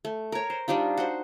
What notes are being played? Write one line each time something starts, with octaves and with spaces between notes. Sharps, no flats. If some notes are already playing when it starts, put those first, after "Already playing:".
A3
A#4 C#5
C5
G3 D4 D#4 F4
F#4 C5